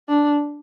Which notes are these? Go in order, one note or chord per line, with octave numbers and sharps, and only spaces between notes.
D4